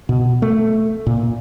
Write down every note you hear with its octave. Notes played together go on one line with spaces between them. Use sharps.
B2
A3
A#2